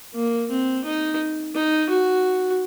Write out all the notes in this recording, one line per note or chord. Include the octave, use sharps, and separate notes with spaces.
A#3
C4
D#4
D#4
F#4